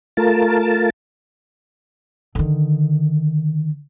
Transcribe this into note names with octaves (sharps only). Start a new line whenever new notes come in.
A3 F4 A#4 A5
D3 D#3